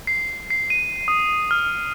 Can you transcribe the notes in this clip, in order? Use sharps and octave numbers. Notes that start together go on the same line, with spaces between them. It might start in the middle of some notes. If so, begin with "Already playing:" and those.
C7
C7
D#7
D#6
F6